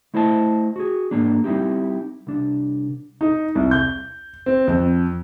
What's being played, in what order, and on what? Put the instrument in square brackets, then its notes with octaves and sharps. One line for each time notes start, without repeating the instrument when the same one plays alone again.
[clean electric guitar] A3 E4 C5 D#5 A5
F#4 G#4
G#2 A#3 D4
G3 C4 D#4 E4 G4
C2 D4
[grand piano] D#4
C2
G6
C4
F2